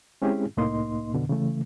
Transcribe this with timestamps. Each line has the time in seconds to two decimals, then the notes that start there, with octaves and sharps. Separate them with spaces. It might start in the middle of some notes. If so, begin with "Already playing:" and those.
0.22 G#3 C4 C#4 E4 G4 G#4
0.57 C2 A2 A#3 D#4 D#5 C6
1.14 F2 B2 D3
1.29 C#3 E3 A3